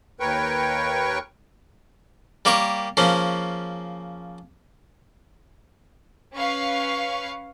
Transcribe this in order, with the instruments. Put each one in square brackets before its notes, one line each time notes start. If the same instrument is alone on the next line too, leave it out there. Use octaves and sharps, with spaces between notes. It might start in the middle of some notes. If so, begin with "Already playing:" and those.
[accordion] D#2 A#4 B4 C#5 G5 C#6
[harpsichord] G3 A#3 G4 A#4 C#5
C#3 F3 A#3 C#4
[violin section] C#4 B4 F5 C#6